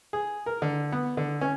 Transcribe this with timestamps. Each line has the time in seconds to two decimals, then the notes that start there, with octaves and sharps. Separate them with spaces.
0.13 G#4
0.46 A#4
0.62 D3
0.92 B3
1.17 D3
1.41 C#4